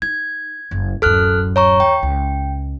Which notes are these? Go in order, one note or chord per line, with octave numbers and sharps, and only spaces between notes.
D#4 G#6
F#1
D1 F#2 A4 F6 F#6
C#5 A#5 C#6
D#2 G5
C#2